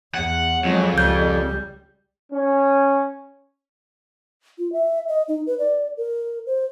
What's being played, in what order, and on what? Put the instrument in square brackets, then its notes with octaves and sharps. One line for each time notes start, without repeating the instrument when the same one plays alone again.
[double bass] E2 [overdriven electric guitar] F#5
[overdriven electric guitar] F2 [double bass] F#3 G#3
[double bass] C#2 G3 [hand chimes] G6
[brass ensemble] C#4
[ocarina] F4
E5
D#5
D#4
B4
D5
A#4
C5